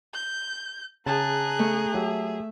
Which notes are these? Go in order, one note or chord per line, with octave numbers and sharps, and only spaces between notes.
G6
C#3 G#4 A5 A#5 F#6
A3
F#3 G4 E5